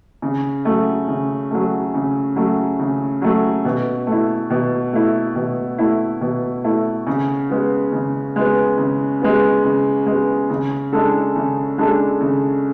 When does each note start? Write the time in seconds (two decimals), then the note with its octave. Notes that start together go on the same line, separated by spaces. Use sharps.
0.22 C#3
0.65 F#3 A3
1.08 C#3
1.51 F#3 A3
1.94 C#3
2.36 F#3 A3
2.79 C#3
3.22 F#3 A3
3.65 B2
4.07 A3
4.12 E4
4.50 B2
4.93 A3 E4
5.36 B2
5.79 A3 E4
6.21 B2
6.64 A3 E4
7.07 C#3
7.50 G#3 B3
7.92 C#3
8.36 G#3 B3
8.78 C#3
9.22 G#3 B3
9.64 C#3
10.06 G#3 B3
10.50 C#3
10.93 G#3 D4 A4
11.36 C#3
11.78 G#3 D4 A4
12.20 C#3